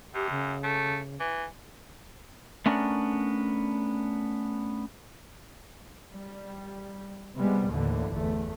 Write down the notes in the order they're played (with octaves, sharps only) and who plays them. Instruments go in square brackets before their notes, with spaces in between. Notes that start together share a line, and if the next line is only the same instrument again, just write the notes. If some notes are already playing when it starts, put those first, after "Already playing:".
[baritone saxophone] F#2 [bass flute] G4
[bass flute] C#3
[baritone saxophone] A3
E3
[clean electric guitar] A3 B3 C#4 D4 A#4
[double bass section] G3
C3 G3 G#3 B3
D#2 A2 D3 E3
G1 E2 A3